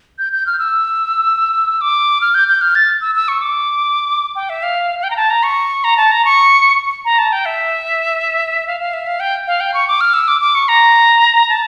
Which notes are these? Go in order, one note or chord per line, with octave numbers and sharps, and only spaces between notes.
G6
G6
F6
E6
D6
F6
G6
G6
F6
A6
E6
E6
C#6
D6
G5
E5
F5
F5
G5
A#5
A5
A#5
C#6
A#5
A5
A#5
C#6
A#5
A5
G5
E5
F5
F5
E5
F5
G5
F5
G5
C#6
D6
F6
E6
D6
D6
C#6
A#5
A5